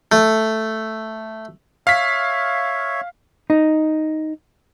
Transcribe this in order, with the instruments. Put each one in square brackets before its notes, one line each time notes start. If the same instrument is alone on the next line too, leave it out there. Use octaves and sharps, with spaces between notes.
[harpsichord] A3
[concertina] C#5 E5 [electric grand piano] F5 B6
[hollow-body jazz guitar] D#4